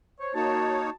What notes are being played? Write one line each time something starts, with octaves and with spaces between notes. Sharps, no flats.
C5 C#5
A#3 D#4 F#4 C#5 A5